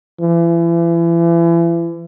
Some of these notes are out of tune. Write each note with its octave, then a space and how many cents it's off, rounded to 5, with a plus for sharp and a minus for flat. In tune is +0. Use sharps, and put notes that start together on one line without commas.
E3 +35